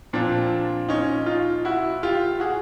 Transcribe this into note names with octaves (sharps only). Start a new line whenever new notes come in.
A#2 F3 C4 D4
C#4 D#4
D#4 F4
E4 F#4
F4 G4
F#4 G#4